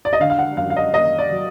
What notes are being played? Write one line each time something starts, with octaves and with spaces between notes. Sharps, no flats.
D5
D#5
D3 F5
F5
F#5
F#2 F5
F5
D#5
A#3 D#5
D5
F#3